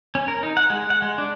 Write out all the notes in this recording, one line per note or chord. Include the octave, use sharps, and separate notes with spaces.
C#4
A#4
D#4
F#5
G#3
F#5
G#3
D4